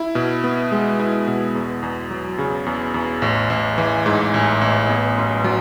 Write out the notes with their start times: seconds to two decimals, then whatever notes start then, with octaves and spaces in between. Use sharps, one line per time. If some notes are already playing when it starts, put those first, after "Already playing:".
Already playing: E4
0.15 B2
0.44 B3
0.72 G#3
0.99 E4
1.28 B2
1.55 E2
1.83 E2
2.11 F#3
2.38 C#3
2.66 E2
2.94 E2
3.22 A1
3.50 A1
3.78 E3
4.06 G#2
4.34 A1
4.61 A1
4.89 B3
5.18 F#2
5.44 F#3